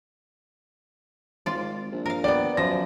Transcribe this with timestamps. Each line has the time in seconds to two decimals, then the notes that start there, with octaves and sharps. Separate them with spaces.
1.46 G#1 F4 D5
1.92 A#1
2.06 A#4 F5
2.24 G3 B3 D5
2.57 F#2 F3 A#6